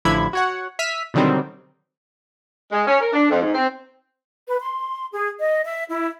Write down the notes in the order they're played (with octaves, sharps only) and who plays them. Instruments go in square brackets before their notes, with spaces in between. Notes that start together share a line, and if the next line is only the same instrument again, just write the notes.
[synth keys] A1 D3 F3 E4 B5 G#6
F#4 C#5 F#5
E5 F6 B6 D#7
B2 D3 D#3 F#3 G3 C4
[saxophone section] G#3
C#4
A#4
D4
F2
G#2
C4
[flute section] B4
C6
G#4
D#5
E5
E4